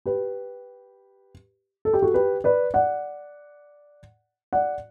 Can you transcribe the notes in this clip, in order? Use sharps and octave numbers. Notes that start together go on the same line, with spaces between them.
G4 B4
A4
G4
F#4 A4
G4 B4
B4 D5
D5 F#5
D5 F#5